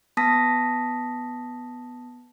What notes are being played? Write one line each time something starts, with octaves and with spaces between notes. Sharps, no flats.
B3 A5 D#6 A#6 B6